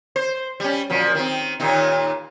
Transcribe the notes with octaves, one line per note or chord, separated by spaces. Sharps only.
C5
G3 C#4
A#2 F3 F#3
D#3 C4
D#2 A#2 D#4